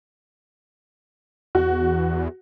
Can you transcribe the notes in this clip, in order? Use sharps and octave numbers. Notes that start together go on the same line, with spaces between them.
E2 F#4